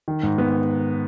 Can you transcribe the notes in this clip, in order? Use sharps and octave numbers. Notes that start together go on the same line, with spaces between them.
D#3
G#2
B3